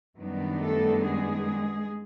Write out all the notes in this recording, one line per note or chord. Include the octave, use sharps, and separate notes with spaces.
F#2 D#3 G3 B3 D4
A3 A4
G#3 G#4